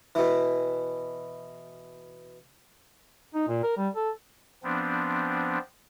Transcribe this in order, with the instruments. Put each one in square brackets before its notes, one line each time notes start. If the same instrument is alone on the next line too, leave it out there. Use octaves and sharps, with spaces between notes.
[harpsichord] B2 E3
[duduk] D#4
A#2
A#4
G3
A4
[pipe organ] F3 B3 C4 D4